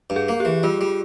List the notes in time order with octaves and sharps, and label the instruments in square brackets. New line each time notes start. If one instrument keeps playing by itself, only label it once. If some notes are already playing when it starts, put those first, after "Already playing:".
[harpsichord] G2
[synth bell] G#4
[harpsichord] A#3
[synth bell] G4
[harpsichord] E3
[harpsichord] G3 [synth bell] F4
[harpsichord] G3